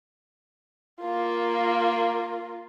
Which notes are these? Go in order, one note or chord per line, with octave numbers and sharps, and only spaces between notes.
A#3 F4